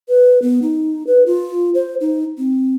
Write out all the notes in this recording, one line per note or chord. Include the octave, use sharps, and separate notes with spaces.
B4
B3
D#4
B4
F4
C5
D#4
C4